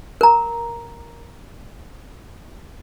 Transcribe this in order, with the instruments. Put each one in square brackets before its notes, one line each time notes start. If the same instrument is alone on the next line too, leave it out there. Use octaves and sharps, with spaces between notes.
[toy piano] A#4 A#5